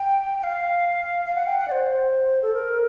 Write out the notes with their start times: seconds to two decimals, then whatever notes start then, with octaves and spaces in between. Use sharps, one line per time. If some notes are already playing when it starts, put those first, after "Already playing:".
Already playing: G5
0.39 G5
0.44 F5
1.25 F5
1.35 F#5
1.46 G5
1.58 F#5
1.68 D5
1.72 C5
2.42 A4
2.54 A#4